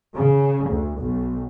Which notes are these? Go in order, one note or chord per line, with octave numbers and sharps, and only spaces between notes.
C#3
D2
B1